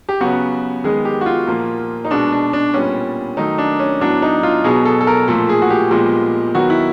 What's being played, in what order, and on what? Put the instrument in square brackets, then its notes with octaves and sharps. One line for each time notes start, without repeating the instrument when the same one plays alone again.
[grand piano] G4
C#3 F#3 B3 F#4
D#3 G#3 B3 G#4
G4
F#4
F4
A#2 F3 A#3
D#4
B2 G#3 B3 D4
D4
D4
A#2 G3 B3 C#4
D#3 F#3 A3 D#4
D4
C#4
A2 F#3 B3 D4
D#4
F4
B2 F#3 B3 G#4
A4
A4
A#4
A#2 F3 A3 A4
G#4
F#4
G4
A#2 F3 G#3 B3
D#3 F#3 B3 F#4
E4